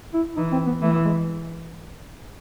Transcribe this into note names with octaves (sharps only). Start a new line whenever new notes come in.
E4
E3 D#4
C4
B3
E3 A3
G#3